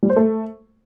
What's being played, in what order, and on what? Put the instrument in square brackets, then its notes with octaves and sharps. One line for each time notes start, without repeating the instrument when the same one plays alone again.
[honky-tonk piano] G3
C5
A3